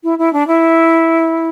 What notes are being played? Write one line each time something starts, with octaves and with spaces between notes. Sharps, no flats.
E4
E4
D4
E4